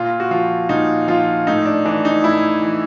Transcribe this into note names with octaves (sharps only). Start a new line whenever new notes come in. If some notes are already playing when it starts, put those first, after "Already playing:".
Already playing: A#2 F4
F#4
F3 F4
A#2 D#4
F3 F4
A2 D#4
D4
E3 D4
D#4
A2 E4
E3